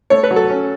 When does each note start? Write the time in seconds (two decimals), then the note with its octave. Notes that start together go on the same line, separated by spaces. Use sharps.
0.10 A3 C#5
0.23 B4
0.31 F#3
0.36 A4
0.50 C#4